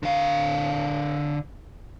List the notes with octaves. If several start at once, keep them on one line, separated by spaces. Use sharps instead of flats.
D3 F5